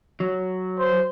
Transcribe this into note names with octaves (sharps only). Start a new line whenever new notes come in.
F#3
C5